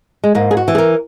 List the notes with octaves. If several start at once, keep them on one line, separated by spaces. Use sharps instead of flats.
G#3
G#2 A#3
G#4
F#4
E3
G#4
A#4